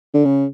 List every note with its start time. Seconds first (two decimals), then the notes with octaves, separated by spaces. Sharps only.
0.14 D3
0.25 C#3